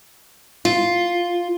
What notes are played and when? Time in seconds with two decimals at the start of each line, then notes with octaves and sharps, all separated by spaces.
0.65 F4